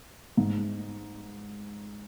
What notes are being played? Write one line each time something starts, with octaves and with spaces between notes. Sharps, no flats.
G#2